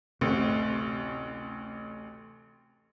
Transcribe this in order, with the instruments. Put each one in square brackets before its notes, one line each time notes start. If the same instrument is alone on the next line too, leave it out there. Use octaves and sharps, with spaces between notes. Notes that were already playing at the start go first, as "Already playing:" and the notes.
[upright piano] A1 D2 [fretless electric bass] C3